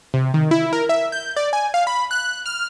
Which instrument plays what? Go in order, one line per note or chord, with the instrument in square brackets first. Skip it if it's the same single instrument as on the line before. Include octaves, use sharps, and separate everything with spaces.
[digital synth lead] C3
D#3
E4
A#4
E5
G6
D5
G#5
F5
B5
F#6
F6